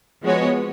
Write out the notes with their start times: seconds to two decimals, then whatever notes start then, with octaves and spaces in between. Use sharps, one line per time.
0.22 F3 G#3 B3 F#4 C#5